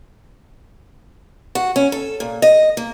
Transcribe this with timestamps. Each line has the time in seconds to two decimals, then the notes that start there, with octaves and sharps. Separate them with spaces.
1.55 F#4
1.76 C#4
1.92 A4
2.20 A#2
2.42 D#5
2.77 A#3